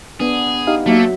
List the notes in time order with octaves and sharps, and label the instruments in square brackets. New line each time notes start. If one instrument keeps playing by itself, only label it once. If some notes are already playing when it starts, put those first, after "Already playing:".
[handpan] B3 D4 [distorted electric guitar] G#4
[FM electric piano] D#4 G4 F5
[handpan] F#3 E5 [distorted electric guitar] A3 [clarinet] A#3